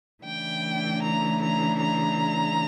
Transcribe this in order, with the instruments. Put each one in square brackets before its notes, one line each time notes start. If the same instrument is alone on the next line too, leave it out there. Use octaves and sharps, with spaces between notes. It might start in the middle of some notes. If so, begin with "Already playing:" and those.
[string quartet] C#3 E3 A3 D4 G5
A#5
A#5
A#5